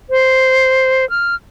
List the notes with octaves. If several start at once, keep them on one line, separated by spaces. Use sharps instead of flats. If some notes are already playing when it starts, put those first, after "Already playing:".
C5
F6